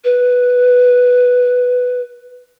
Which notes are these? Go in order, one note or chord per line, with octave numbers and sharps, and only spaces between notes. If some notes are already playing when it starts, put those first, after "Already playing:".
B4